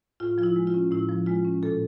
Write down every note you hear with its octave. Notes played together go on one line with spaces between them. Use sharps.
A2 F4
F3 F4
E4
G#3
F4
C#4
A2 E4
F3
G#3 F4
C#4
A#2 A4